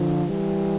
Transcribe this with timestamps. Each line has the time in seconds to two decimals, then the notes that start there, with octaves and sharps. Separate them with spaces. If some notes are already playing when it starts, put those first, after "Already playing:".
Already playing: D3 F3
0.26 E3 G3